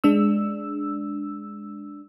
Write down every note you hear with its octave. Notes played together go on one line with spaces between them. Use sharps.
G#3 D4 E6